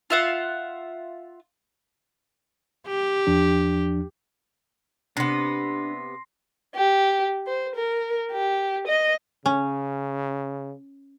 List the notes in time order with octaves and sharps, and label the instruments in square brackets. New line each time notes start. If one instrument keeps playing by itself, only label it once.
[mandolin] F4 E5 F#5
[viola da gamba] G4
[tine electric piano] E2 F3 D4
[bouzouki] C3 B3 [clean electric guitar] D4 [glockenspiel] C6 A#6 C7
[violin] G4
C5
A#4
G4
D#5
[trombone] C#3 [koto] C#4